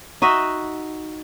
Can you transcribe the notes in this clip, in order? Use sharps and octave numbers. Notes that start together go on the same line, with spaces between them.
D#4 F#4 D#5 E5